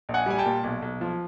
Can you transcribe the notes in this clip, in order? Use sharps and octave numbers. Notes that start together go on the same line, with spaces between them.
A#1
F#5 G#5
G3 G#5
G5 A5
A#2
B1
B1
F3